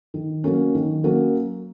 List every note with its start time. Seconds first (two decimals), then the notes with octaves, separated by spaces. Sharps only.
0.14 D#3
0.44 F#3 A#3 C#4
0.75 D#3
1.04 F#3 A#3 C#4